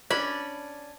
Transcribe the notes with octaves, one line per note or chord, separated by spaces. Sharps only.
C#4 D4 B5